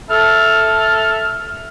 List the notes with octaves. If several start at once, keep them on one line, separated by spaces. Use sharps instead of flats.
A4 E5 F6